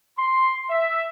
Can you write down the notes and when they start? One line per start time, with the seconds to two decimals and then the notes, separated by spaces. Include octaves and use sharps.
0.18 C6
0.70 E5